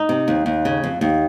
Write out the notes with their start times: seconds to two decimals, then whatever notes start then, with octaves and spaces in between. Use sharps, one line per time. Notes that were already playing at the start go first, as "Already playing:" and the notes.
Already playing: D#4
0.09 C3
0.28 D#2
0.46 D#2
0.65 C#3
0.84 F2
1.01 D#2